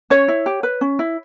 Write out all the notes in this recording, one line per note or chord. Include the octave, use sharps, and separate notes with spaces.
C#4 C#5
E4
G4
B4
C#4
E4